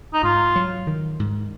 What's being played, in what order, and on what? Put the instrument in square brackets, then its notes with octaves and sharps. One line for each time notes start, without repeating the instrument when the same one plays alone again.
[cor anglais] D#4
[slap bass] G#2 [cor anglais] F4
[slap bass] F#3
D#3
G#2